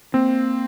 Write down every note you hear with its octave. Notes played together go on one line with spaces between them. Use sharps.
A#3 C4